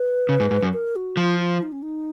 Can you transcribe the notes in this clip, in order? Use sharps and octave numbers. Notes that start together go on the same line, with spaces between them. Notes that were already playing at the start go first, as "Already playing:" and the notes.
Already playing: B4
C#3
G#2
G#2
F#2
A#4
F#4
F3 F4
F4
D#4
C#4
D#4